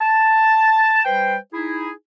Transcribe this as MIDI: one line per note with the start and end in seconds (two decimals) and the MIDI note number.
0.01 1.01 81
1.05 1.36 55
1.05 1.36 71
1.05 1.36 72
1.05 1.36 79
1.53 1.90 63
1.53 1.90 64
1.53 1.90 68